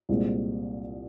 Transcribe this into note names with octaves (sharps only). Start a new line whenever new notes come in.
C2 A#2 G#3 C4